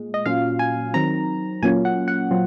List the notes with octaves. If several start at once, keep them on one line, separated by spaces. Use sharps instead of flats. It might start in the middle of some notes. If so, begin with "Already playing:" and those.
Already playing: A#2 G#3
D#5
A#2 F#3 C#4 F4 F5
G#5
D#3 F#3 C4 A#5
A#2 F#3 A#3 C#4 F4 G#5
F#5
F#5
A#2 F#3 C4 F4